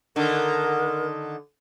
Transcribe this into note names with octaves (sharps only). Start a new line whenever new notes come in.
D3 D#3 A#4